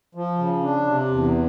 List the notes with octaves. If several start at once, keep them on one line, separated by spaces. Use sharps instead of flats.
F3
C#3
D4
C3
E2